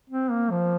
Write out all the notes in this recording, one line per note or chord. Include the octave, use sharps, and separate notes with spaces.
C4
A#3
F3